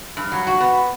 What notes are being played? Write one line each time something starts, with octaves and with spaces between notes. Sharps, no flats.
G2
F#3
F#4
B3